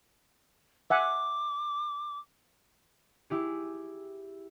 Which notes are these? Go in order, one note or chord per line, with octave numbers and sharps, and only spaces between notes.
E5 F#5 G#5 D6
E4 G4 G#4